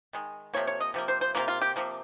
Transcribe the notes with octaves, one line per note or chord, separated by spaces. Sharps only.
D#3 G#3
C3 F3 A#3 C#5
C#5
D#5
C3 F3 A#3
C5
C5
C3 F3 A#3 F4
F4
G4
C3 F3 A#3